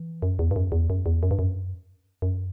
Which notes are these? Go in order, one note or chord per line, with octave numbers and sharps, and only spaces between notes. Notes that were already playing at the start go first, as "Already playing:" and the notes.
Already playing: E3
F#2
E2
G2
F#2
E2
F#2
E2
F#2
G2
F#2
F#2